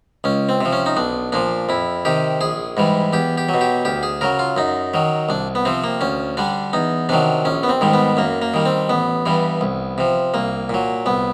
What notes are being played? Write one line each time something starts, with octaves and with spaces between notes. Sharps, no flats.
C#2 C#4
C4
C3 F3
C#4
D#4
B1 D4
A#2 F3 D4
F2 E4
C3 D#3 G4
A#1 G#4
G#2 E3 G3
E2 G4
G4
F#3
B2
G4
D2 G4
G#4
C#3 F#3 A#4
F4
F#2 D#4
D#3 F#3
C2 D4
B3
C3 F3 C4
A#3
D2 C#4
D3 G3 D4
E2 D#4
C3 D#3 F#3 D4
A#1 C#4
B3
C4
G#2 D#3 G3
B3
F#2 A#3
A#3
D#3 G3
C4
A1 B3
G2 E3 G3
C2
C3 F3
C2 A#3
A#2 F#3
C2 B3